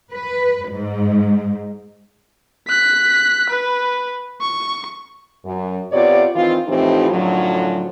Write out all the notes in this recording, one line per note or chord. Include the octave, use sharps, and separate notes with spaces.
B4
G#2
F#6 B6
B4
C#6
F#2
C3 B3 F4 C#5 D5
D#3 E3 C4 F4
A2 E3 F3 C4 D#4 G4
F#2 A2 D3 F3 F#3